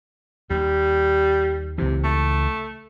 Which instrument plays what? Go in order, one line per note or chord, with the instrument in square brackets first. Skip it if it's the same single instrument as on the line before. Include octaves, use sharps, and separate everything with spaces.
[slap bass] D#2 [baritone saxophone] G3
[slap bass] C#2 E3 [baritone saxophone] C3
[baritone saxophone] A3